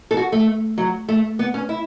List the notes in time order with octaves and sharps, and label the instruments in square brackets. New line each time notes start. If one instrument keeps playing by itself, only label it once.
[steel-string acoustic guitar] A4
F#4
A3
F#3
A3
B3
C#4
E4